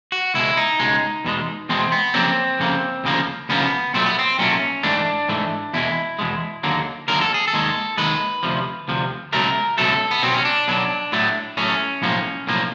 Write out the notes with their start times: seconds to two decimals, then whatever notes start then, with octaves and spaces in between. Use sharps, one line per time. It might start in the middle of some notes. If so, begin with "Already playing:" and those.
0.12 F#4
0.34 C#2 B2 G#3 E4
0.57 D#4
0.80 C#2 B2 G#3
1.25 E2 B2 G#3
1.69 E2 B2 G#3 C4
1.92 B3
2.14 F2 C#3 F#3 A#3 C4
2.59 F2 C#3 F#3 A#3
3.04 D2 C#3 F3 A#3
3.49 D2 C#3 F3 A#3 B3
3.94 B1 A#2 F#3 A3 C4
4.06 B3
4.19 C4
4.39 B1 A#2 F#3 A3 C#4
4.83 G#2 E3 A3 D4
5.28 G#2 E3 A3
5.74 E2 B2 G#3 E4
6.19 E2 B2 G#3
6.63 D#2 D3 F#3 A#3
7.08 D#2 D3 F#3 A#3 A#4
7.21 A4
7.34 G#4
7.48 A4
7.53 D#2 D#3 G#3
7.98 D#2 D#3 G#3 B4
8.43 D2 C3 F3
8.88 D2 C3 F3
9.33 C#2 B2 F#3 A3 A#4
9.78 C#2 B2 F#3 A3 A4
10.11 B3
10.23 B1 B2 F#3 C4
10.34 C#4
10.45 D4
10.68 B1 B2 F#3
11.12 A2 F#3 A3
11.57 A2 F#3 A3 C#4
12.02 B1 A2 F3 A#3
12.47 B1 A2 F3 A#3